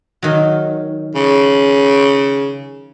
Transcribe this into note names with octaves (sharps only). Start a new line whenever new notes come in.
D#3 F#3
C#3